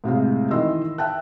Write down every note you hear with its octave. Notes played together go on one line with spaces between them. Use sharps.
A2 C3 G#3 F5
D#3 E3 D#5 C6 E6
E5 G5 A5 F#6